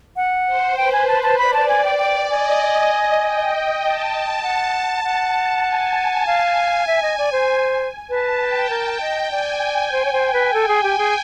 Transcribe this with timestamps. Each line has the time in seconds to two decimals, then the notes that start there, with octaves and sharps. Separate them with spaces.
0.16 F#5
0.47 C5
0.77 B4 G5
0.92 G#5
1.08 C5 A5
1.23 A5
1.38 D5 B5
1.54 A5
1.69 G#5
1.84 G5
1.99 D5 G5
2.30 D#5 G#5
3.21 G5
3.82 G5 A5
4.12 A5
4.43 F#5
5.04 F#5
5.65 G#5
6.26 F5 G#5
6.87 E5
7.02 D#5
7.18 D5
7.32 C5
8.09 B4 A5
8.39 G5
8.70 A#4
9.01 D#5
9.31 D5 G#5
9.92 C5
10.05 C#5
10.13 C5
10.33 B4
10.53 A4
10.68 G#4
10.83 G4
10.98 G#4